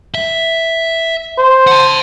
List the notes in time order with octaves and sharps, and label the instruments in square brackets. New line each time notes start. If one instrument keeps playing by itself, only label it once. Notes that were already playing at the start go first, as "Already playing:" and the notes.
[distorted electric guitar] E5
[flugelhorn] C5
[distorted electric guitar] F#5 A5